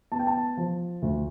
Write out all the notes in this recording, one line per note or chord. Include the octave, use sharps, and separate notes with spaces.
B3 A5
G5
A5
F3
D2